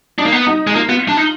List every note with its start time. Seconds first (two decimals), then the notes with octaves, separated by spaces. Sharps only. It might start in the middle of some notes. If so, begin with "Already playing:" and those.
0.18 D4 D#4
0.25 A#3
0.32 B3
0.47 D#4
0.67 G#3
0.70 D#4
0.75 A#3 F4
0.88 B3 F4
1.08 D4
1.17 D#4